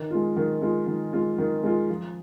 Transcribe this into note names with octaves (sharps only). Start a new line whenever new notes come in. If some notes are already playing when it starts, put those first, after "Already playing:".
Already playing: D#3
G#3 F4
D#3
G#3 F4
D#3
G#3 F4
D#3
G#3 F4
F3